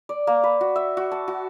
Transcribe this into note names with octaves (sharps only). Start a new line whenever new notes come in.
D5
A#3
B4
F#4
E5
F#4
A5
F#4